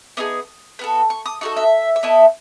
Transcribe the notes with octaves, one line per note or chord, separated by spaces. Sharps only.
B3 D#4 G#4 D#6
B3 F#4 A4
C#6
D#6
D#4 F#4 A4 C#6
E5
E5
B3 E4 A4 D#5